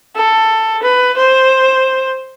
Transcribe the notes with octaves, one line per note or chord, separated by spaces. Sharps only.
A4
B4
C5